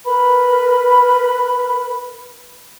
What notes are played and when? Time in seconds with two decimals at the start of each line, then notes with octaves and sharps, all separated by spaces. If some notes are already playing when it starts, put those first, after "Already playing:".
0.06 A#4 B4 B5